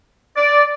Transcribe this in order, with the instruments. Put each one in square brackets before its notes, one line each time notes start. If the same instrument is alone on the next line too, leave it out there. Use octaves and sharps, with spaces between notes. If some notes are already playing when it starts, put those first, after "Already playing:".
[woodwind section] D5